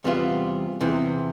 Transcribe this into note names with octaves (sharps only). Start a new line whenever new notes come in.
E2 C3 G3 B3 F4
E2 C3 E3